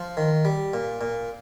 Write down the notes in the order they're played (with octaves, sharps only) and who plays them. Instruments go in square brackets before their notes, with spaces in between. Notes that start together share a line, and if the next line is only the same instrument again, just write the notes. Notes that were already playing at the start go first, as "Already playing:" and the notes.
Already playing: [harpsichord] F3
D#3
G3
A#2
A#2